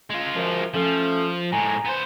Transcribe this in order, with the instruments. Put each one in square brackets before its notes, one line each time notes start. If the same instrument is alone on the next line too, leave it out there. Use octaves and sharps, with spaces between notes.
[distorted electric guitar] G#3 F4
[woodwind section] F#2 F3
[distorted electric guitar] F3 [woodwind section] A3 C#4
[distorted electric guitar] A2 G#3 [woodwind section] G#5 A#5
[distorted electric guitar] B3 C5